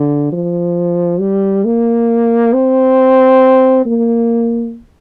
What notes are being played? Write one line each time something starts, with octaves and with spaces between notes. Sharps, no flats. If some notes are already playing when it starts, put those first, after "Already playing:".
Already playing: D3
F3
G3
A#3
C4
A#3